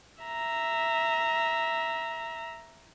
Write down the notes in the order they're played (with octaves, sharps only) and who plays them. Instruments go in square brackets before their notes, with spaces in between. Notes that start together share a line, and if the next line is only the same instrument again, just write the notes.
[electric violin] E5 A#5